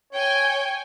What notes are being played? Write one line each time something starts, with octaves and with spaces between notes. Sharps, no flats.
C#5 G5 G#5